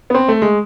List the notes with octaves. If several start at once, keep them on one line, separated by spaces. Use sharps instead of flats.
B3
C4
A3
G#3